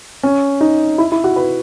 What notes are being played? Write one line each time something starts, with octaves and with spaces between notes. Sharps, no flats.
C#4
D#4
E4
E4
F#4
B4